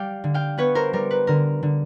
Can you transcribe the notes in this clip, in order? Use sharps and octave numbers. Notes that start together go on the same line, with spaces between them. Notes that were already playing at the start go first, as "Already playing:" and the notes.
Already playing: G3 F5 G5
D3
F5 G5
B3 B4 C#5
A#4 C5
G3 A#4
B4
D3 A#4
D3